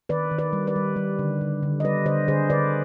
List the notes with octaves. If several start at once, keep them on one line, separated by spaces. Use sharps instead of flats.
D#3 B4 D5
D#3
B4 D5
G3
B4 D5
G3
G3
D3
D3
D3
D#5
G3 B4 D5
D3 C5 D#5
D3 G#4 C5
D3 B4 D5